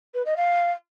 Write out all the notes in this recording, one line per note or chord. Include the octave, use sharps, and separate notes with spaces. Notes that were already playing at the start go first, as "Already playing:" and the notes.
B4
D#5
F5